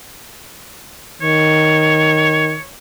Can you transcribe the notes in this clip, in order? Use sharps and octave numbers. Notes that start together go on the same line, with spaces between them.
D#3 C#5